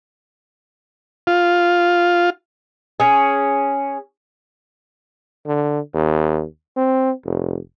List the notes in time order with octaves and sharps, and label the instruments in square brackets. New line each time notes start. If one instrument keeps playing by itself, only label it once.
[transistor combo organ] F4
[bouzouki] C#4 G#4
[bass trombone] D3
D#2
C4
F1